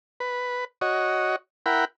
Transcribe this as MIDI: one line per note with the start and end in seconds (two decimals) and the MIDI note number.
0.20 0.65 71
0.81 1.36 66
0.81 1.36 73
0.81 1.36 75
1.66 1.85 64
1.66 1.85 70
1.66 1.85 78
1.66 1.85 79
1.66 1.85 83